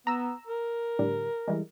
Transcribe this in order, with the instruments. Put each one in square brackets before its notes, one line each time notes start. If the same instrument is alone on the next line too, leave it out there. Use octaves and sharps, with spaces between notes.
[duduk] B3 [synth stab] A#5 E6
[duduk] A#4
[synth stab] A2 D3 G3
E3 G3 G#3